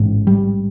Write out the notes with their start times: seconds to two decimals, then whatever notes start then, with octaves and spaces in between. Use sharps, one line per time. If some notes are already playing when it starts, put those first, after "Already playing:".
Already playing: A1 G#2
0.27 G3